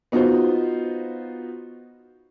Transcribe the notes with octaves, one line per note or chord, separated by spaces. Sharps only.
B3 D#4 F4 F#4 C5